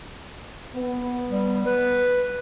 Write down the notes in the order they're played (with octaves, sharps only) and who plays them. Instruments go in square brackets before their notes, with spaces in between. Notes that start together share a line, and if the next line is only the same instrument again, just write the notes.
[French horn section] B3
[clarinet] G3
B4